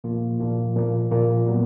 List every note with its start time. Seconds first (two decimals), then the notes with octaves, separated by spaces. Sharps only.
0.04 A#2 F3 A#3 F4
0.40 A#2 F3 A#3 F4
0.75 A#2 F3 A#3 F4
1.11 A#2 F3 A#3 F4
1.46 A#2 F#3 B3